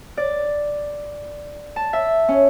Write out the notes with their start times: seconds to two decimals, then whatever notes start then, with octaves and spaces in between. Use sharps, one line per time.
0.17 D5
1.76 A5
1.93 E5
2.28 C#4